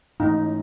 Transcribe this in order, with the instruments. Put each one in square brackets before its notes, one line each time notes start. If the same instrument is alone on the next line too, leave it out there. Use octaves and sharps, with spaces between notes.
[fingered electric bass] G#2 E3 A3 C#4 [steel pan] D#4